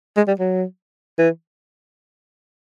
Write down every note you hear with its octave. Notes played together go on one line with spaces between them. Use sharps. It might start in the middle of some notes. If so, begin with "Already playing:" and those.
G#3
G3
F#3
E3